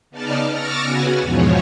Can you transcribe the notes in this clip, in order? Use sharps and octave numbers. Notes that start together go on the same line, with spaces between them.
C#3 B3 D#4 D5 A5 F6
C#6 D6 E6 F6 A6 A#6
C#3 B3 F#4 F#5 G#5
E2 G#2 B2 F3 C#5